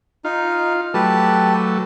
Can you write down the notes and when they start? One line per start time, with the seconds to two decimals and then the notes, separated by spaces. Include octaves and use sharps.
0.25 D#4 F4
0.94 F#3 A3 G4 B4 A5